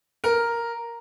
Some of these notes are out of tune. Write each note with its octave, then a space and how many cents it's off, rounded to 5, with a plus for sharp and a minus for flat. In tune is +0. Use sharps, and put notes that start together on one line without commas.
A#4 +0 A#5 +0